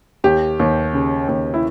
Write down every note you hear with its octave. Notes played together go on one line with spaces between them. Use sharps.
D#2 G4
D#2
C#3
D#2
E4